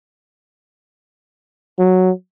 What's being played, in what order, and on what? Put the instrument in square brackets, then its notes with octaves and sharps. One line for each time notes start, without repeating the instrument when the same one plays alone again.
[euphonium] F#3